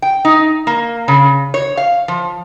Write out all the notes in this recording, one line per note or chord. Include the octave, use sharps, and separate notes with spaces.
G5
D#4
A#3
C#3
C#5
F5
F3